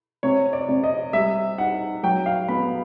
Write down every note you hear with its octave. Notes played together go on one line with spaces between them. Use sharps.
C3 C#5
D5
C3
D#5
G3 E5
D#4 F#5
F#3 G5
F5
B3 B5